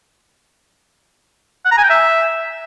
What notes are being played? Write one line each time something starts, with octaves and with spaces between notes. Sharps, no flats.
F#5
A#5
G#5
G5
E5